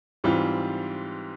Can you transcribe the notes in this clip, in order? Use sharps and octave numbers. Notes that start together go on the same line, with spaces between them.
G#2 E3 G3 C4 F4